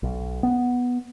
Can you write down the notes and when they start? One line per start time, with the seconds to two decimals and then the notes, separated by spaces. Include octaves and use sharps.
0.03 B1
0.43 B3